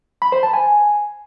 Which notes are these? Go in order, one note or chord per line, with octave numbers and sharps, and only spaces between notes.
B5
C5
A5
G#5